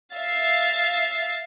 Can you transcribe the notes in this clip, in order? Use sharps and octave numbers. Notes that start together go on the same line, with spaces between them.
E5 F5 A6 C7